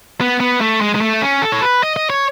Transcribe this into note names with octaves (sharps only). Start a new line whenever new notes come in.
B3
B3
A3
G#3
G#3
A3
C#4
A4
C#5
B4
D#5
D#5
C#5